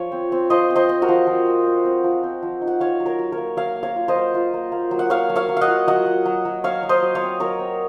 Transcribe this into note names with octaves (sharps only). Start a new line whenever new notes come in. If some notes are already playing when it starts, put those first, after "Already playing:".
Already playing: F3 C#5
C4
C4
F3 C5 D#5
C4
C5 D#5
C4
F#4 A#4
F3
F3
C4
C4
C4
F3
C4
F3
D#4
F#5
F4 C#5 F5
F#3
A#4 C#5
F#3
A#4 C#5
A#3
F#3 C#5 F5
A#3
C#5 F5
F4
C5 D#5
F#3
F4
A#3
A#3
F#3
F#5
A#3 C#5 F5
F#3
C#5 F5
F#3
D#5 F5 F#5
F4
F#3 D#5 F#5
F#3
F#3
F#3
F#3 C#5 F5
F#3
C5 D#5
F#3
C#5 F5
C4
F#3 A#4 C#5
C4